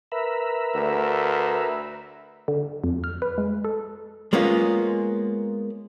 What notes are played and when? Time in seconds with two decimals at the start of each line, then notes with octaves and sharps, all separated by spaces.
0.12 A#4 B4 E5
0.74 D2
2.48 D3
2.84 F2
3.04 F6
3.22 B4
3.38 G#3
3.65 A4
4.33 G#3 A#3 B3 C#4 F4